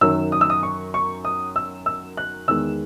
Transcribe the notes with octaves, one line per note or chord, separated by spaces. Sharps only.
F#2 D#3 F#3 E6
D#6
E6
D#6
C#6
C#6
D#6
E6
E6
F#6
E2 D#3 G#3 E6